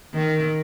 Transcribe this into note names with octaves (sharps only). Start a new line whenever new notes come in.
D#3